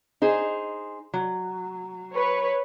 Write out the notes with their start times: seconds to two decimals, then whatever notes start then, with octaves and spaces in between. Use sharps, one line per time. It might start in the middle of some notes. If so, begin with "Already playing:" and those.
0.22 D#4 G#4 C5
1.14 F#3
2.13 B4 C#5